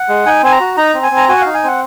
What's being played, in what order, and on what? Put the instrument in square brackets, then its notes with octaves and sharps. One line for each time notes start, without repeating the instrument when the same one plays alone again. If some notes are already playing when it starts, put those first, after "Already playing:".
Already playing: [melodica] F#5
G#3
D#4 G#5
C4 G#5
A#5
F#4
D#4 A#5
C4
G#5
C4
A#5
F#4 G#5
F#5
D#4 F5
G#5
C4 F#5